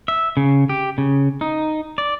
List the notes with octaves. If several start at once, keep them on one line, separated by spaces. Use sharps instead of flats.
E5
C#3
G4
C#3
D#4
D5